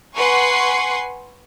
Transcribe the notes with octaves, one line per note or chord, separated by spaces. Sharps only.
B4 F#5 G#5 C6 C#6 C7